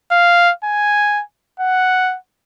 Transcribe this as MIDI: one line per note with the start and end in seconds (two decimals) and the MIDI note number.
0.11 0.51 77
0.64 1.22 80
1.60 2.16 78